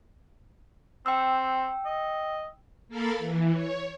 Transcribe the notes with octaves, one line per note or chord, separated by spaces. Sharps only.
C4 G5 E6
D#5
A#3 A4 A#4 F5 B5 A6
E3
C#5